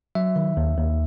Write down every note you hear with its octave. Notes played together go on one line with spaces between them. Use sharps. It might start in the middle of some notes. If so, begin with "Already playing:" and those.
F#3 E5
D#3
D#2
D#2